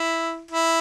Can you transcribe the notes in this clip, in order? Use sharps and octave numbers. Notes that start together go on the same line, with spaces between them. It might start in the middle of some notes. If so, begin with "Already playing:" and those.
Already playing: E4
E4